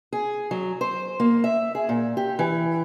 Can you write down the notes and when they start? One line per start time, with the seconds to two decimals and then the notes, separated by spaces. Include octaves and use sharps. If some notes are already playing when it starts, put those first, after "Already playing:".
0.13 G#4
0.51 F#3
0.81 C5
1.20 A#3
1.44 E5
1.75 G#4
1.89 A#2
2.17 G4
2.39 E3